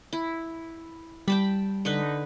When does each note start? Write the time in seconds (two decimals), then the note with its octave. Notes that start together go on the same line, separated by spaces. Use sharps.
0.13 E4
1.28 G3 G5 A5 B5
1.85 D3 D#4 B4